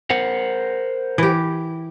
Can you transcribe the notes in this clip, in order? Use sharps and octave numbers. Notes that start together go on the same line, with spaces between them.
A#4 C5 F#5
E3 G4